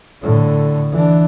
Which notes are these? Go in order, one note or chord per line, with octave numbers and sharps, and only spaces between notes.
A2 D3
E3 D4